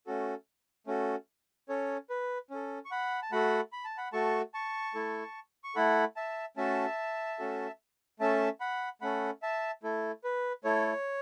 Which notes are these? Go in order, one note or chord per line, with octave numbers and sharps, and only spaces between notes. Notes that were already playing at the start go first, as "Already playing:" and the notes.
A3 C#4 F#4 A4
A3 C#4 F#4 A4
C#4 A4 C#5
B4
C#4 A4
C#6
F#5 B5
A5
A3 F#4 A4 F#5 B5
B5
A5
F#5 B5
A3 F#4 A4 A5 C#6
A5 C#6
A3 E4 A4
C#6
A3 E4 A4 F#5 B5
E5 A5
A3 C#4 F#4 A4 E5 A5
A3 C#4 F#4 A4
A3 C#4 A4 E5 A5
F#5 B5
A3 C#4 A4 F#5 B5
E5 A5
A3 E4 A4
B4
A3 E4 A4 C#5